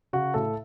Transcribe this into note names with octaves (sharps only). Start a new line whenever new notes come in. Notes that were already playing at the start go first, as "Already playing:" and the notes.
C#3 F#4
A2 A4